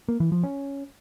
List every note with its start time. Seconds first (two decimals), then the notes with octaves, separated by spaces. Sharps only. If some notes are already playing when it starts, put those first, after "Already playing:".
0.08 A#3
0.20 E3
0.32 F3
0.43 C#4